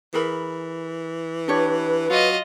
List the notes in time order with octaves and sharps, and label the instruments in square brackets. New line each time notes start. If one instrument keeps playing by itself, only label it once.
[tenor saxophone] E3 [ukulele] G#4 A#4 B5
[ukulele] D4 G4 C#5 [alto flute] B4
[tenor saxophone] F#3 [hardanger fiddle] F4 D#5 [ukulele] F#4